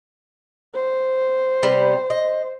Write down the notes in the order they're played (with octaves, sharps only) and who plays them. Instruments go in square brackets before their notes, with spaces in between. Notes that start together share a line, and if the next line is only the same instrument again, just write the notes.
[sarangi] C5
[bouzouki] C3 G3 B3
D#5